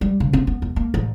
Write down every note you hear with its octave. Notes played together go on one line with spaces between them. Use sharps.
G3
C#3
C4
B3
E2
A#3
A1